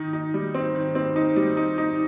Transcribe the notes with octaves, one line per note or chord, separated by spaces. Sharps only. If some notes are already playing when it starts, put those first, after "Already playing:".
Already playing: D#3 D#4
D#4
G3
C4
D#3
C4
D#4
G3
D#4
D#4